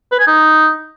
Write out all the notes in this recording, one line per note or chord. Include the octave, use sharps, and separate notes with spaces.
B4
G#5
D#4